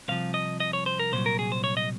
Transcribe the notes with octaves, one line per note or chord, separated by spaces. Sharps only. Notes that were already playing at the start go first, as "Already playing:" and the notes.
C2 C3 F3 F5
D#5
D#5
C#5
C5
A#4
C2 A#2 F#3 C5
A#4
G#4
C5
C#5
D#5